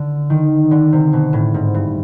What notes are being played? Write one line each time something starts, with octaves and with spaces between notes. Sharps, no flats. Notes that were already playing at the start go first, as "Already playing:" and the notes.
Already playing: D3
D#3
D3
C3
B2
A2
G#2
G2